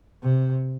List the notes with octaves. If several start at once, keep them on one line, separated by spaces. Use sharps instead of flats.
C3